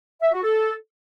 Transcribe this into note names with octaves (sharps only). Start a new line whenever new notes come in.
E5
F#4
A4